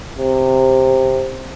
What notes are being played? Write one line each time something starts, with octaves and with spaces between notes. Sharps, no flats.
C3